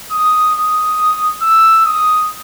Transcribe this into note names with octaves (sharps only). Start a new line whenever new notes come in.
D#6
D#6
E6
D#6